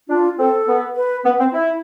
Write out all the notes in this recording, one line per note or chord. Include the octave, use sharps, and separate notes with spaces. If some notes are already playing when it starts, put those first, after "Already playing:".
D4 F4
C4 A4
B3
B4
B3
C4
E4